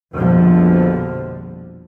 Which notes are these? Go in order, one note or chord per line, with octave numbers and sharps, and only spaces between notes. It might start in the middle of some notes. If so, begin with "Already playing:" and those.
A#1 F2 B2 D3 F3 G3